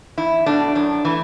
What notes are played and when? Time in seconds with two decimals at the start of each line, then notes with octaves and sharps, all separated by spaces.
0.18 E2 E4
0.46 B2 A3 D4
0.75 F#2 D4
1.05 E3 A3